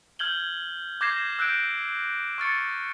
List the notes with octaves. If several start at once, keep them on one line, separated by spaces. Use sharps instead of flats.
F6 G6 G#6 F#7 G7
D6 G6 G#6 A#6 C7 E7
E6 F#6 G6 D7
C#6 F6 A6 C#7